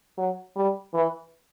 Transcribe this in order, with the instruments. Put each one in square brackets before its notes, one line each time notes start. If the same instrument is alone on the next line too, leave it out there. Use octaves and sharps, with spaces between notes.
[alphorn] F#3
G3
E3